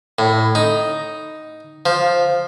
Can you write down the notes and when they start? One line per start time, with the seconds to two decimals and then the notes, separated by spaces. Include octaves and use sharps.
0.19 A2
0.55 D#4
1.86 F3